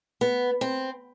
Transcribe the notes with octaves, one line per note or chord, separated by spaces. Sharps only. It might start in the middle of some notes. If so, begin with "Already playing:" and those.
B3
C4